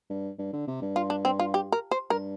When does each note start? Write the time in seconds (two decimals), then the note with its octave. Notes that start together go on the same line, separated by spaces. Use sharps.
0.10 G2
0.39 G2
0.53 D3
0.68 C3
0.82 G2
0.96 F4
1.10 D4
1.25 C4
1.40 F4
1.54 G4
1.72 A#4
1.91 C5
2.10 G2 A#4